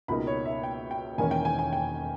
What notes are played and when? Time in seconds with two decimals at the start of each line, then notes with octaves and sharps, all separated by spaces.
0.08 C#2 B2 A#3 D#4 B5
0.27 C#5
0.46 E5
0.64 G5
0.91 G5
1.18 E1 E2 D#3 A#3 C#4 G#5
1.31 G5
1.45 G#5
1.59 G#5
1.73 G5